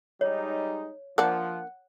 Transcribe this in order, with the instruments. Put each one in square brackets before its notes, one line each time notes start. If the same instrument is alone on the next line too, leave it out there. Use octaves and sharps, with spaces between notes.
[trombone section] G3 G#3 D#4 [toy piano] C#5
[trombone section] F3 [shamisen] A#3 D4 [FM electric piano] F#5